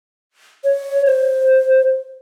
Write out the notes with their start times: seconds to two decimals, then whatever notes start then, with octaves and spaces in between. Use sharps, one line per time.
0.64 C#5
1.06 C5